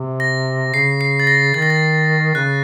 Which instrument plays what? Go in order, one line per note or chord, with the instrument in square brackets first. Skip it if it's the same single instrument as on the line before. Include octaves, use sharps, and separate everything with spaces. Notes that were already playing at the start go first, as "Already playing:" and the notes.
Already playing: [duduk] C3
[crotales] A#6
[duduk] C#3 [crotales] C7
[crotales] C7
A6
A#6
[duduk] D#3 [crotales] A6
[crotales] A#6
A6
[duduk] C#3 [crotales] F#6